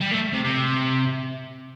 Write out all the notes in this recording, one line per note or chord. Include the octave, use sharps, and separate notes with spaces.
G3
A3
C3
C3